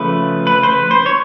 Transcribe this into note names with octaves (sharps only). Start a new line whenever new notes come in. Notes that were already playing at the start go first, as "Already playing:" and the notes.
Already playing: C#3 F3 A3 B4
B4
C5
B4
C5
C#5